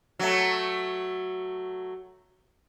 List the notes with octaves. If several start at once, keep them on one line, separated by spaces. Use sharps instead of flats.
F#3 A3